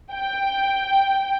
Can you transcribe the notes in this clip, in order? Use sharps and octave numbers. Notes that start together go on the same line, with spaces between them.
G5